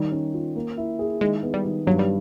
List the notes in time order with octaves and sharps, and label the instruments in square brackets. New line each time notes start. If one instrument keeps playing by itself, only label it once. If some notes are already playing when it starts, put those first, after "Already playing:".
Already playing: [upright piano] D#3 [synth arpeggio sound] G3
[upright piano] C#4
F4
A#3
E4
G#4
[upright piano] D#3 [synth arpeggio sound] G#3
[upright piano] B3
[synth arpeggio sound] G3
[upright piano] D#3
[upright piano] G2 [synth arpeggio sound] F#3
[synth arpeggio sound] G3